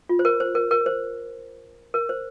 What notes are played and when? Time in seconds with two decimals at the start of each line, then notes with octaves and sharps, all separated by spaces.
0.09 F4
0.19 C5
0.25 A#4
0.40 C5
0.55 A#4
0.71 A#4
0.86 C5
1.94 A#4
2.09 C5